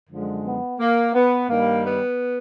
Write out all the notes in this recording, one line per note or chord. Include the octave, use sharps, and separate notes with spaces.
F#2 D3 F3 G#3
B3
A#3
B3
G2 D#3 G3 A#3
B3